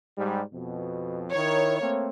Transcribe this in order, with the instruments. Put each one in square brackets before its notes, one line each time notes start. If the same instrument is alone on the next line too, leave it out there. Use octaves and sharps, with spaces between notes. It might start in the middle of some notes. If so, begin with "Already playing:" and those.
[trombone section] G#2 G3
F2 B2
[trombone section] D#3 E4 A#4 [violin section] C#5
[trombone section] A3 A#3 C4